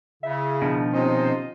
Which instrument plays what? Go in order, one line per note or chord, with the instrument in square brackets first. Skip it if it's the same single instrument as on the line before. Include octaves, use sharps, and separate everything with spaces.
[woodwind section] C#3 E4 [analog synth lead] E5
[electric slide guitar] B2 D#3 F3 [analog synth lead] D4
[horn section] C3 D#4 C5 [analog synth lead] C#4 [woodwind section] F4 D#5